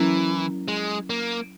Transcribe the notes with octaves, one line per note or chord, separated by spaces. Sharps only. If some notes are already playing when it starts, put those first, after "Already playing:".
Already playing: E3 F#3 C#4 E4 A#4
G#3
A#3